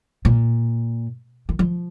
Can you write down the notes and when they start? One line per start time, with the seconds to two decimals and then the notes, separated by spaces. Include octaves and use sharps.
0.25 A#2
1.49 D#3
1.59 F3